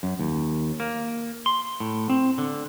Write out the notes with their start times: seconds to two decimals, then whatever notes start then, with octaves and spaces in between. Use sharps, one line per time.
0.03 F#2
0.20 D#2
0.80 A#3
1.46 C6
1.80 A2
2.10 C4
2.38 D3